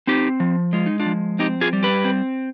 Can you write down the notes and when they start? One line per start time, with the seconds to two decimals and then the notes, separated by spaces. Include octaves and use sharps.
0.07 C4 D#4 G4
0.40 F3
0.73 G#3 F4
0.86 D#4
1.00 D4 F4
1.06 F3
1.39 C4 D#4 G4
1.61 F4 G#4
1.73 G3
1.83 G4 B4
2.05 C4